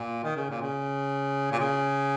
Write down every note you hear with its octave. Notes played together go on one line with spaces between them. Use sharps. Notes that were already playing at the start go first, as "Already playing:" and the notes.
Already playing: A#2
D#3
C#3
A#2
C#3
A#2
C#3